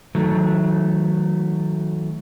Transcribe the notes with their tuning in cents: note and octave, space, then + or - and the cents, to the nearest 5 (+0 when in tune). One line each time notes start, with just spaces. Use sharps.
D#3 +35 F#3 -15 A3 -15